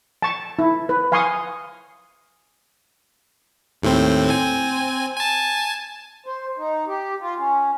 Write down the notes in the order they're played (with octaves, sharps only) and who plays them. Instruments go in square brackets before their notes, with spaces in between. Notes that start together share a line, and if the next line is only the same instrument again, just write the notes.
[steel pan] A5 C#6
E4
B4
F5 G#5 C6 C#6 D#6
[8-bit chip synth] D#2 A2 C4
C4 G#5
G#5 A5
[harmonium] C5
D#4
G4
F4
C#4